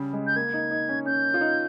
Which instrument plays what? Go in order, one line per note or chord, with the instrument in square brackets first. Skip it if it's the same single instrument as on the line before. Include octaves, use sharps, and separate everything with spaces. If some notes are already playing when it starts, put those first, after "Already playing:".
Already playing: [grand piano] C#3 G3
G#3
[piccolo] G6
[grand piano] A#3 [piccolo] G#6
[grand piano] D#4
D#4
C#4
[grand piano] C#4 [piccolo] G6
[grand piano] F4
D#4